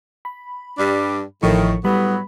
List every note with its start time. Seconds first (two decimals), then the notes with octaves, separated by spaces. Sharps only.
0.25 B5
0.78 G2 G3 D4
1.43 A1 A2 D#3 F3 C#6
1.85 A2 F#3 G3 B3 B5